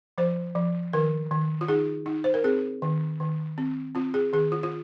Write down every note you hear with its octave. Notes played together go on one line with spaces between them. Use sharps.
F3 C5
F3
D#3 A#4
D#3
F4
D#4 G#4
D#4
C5
A#4
C4 G#4
D#3
D#3
C4
C4 F4
G#4
D#3 G#4
F4
F4